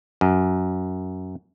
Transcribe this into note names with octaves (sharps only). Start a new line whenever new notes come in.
F#2